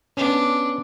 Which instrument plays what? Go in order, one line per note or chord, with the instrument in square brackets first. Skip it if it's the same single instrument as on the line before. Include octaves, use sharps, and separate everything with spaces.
[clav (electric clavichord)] B3 C#4 [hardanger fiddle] D4